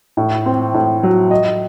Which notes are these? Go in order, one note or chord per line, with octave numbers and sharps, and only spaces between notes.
A2
C4
A2
F#3
D#5